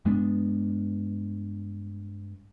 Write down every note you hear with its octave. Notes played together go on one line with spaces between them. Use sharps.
G2 G#3 B3 D4